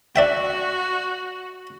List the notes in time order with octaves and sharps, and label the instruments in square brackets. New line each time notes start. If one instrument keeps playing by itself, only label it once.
[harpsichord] D4 E5 G5 [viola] F#4